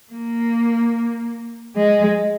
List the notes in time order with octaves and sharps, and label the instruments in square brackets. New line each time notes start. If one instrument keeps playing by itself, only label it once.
[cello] A#3
G#3